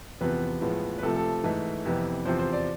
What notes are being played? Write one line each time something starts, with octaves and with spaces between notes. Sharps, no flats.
E2 C3 F3 B3 B4
A2 F3 G#3 B3
B4
C3 F3 A3 A4
A4
G#2 E3 A3
F2 C3 E3 B3
E2 C3 F3 C5
C5
D5